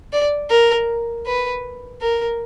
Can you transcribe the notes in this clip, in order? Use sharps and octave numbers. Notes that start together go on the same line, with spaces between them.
D5
A#4
B4
A#4